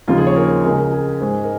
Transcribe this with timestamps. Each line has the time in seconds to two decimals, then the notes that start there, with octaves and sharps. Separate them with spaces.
0.08 D#2 C#3 F3 G#3 F4
0.17 G#4
0.27 C#5
0.36 A#4
0.64 C#2 C#3 G#3 A#4
0.78 A#4
0.92 G#4
1.20 G#2 G#3
1.44 A#4